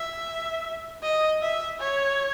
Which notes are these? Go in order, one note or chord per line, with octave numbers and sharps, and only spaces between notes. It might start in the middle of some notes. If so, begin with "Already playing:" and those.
Already playing: E5
D#5
E5
C#5